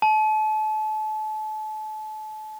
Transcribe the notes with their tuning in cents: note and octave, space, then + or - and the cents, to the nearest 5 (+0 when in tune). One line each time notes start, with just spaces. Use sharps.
A5 -35